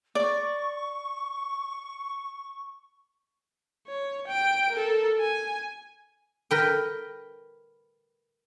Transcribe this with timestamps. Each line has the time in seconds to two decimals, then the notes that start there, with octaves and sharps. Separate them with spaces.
0.15 D5 C#6
3.88 C#5
4.27 G5 D7
4.72 A4 A#4
5.20 G#5
6.51 A#4 B4 G5